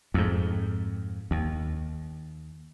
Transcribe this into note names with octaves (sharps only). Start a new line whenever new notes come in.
F2 G#2
D#2